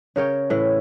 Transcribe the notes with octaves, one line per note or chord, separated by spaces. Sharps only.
C#3 A#4 C#5 G5
A2 E3 E4